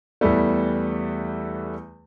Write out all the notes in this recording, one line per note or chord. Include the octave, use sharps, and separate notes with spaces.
E2 E3 G3 A3